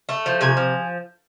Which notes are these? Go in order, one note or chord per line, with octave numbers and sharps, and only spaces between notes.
A3
F3
C3 G#5
F3